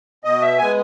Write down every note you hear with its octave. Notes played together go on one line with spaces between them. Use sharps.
B2 D#5
E5
G#3 B3 G#5